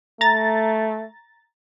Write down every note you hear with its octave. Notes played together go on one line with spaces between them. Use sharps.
A3 A#5 A6